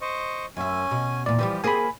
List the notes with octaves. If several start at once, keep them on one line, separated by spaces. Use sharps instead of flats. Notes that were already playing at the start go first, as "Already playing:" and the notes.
C5 D#5 C#6
F#2 C#4 E5 G#5
B2
E2 A#2 D5
E3 F3 G3 G4
A#3 C4 G#4 G#5 B5